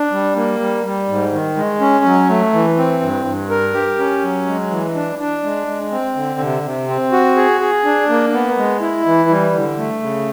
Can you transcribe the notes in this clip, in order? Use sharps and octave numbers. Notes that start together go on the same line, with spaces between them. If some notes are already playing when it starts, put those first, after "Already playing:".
Already playing: D4
G3
A#3
G3
G3
G#2
D#3
G#3
C#4
F#3
A3
E3
C4
G2
G2
A#4
G4
C#4
F#3
G#3
E3
D4
D4
G#3
G#3
C4
D3
C3
C3
C4
F#4
G#4
G#4
D4
A#3
B3
G#3
E4
E3
G3
D3
A3
C#3